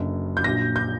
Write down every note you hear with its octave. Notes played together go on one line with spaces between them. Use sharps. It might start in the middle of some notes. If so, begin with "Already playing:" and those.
Already playing: F#1 F#2 D3
G6
A#1 A#2 F#3 A#6
G6